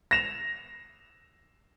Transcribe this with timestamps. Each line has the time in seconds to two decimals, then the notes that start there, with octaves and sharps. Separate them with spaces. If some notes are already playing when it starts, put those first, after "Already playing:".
0.11 A#6 E7 F7